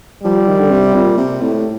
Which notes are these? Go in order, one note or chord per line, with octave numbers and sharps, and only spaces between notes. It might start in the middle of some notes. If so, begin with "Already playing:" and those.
F3 G3
D#3
D3
C3
A#2
C3
A2